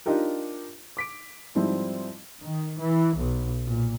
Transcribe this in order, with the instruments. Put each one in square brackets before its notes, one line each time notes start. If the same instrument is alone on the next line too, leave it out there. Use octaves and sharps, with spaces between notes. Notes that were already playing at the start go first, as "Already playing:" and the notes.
[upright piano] D4 D#4 F4 G4 A#4
D6 B6 D7
G#2 F3 G3 C4 E4
[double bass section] D#3
E3
B1
A#2